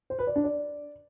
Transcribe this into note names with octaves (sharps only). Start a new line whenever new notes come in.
C5
B4
D5
D4
D5